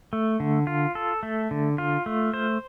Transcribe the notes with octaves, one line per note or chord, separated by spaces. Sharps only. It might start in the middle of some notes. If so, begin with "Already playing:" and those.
A3
D3
F4
A4
A3
D3
F4
A3
C5